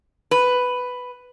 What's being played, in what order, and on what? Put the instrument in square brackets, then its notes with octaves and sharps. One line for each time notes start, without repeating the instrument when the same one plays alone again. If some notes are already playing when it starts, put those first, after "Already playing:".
[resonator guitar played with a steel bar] B4